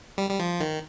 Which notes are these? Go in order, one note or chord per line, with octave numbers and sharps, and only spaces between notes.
G3
G3
F3
D#3